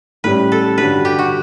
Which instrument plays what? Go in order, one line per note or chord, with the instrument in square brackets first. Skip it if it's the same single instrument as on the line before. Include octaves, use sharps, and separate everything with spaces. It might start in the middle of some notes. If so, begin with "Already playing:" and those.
[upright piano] A2 G3 C#4 [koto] B4
[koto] A4
[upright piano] G2 D3 G3 D4 F#4 [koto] B4
[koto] G4
F#4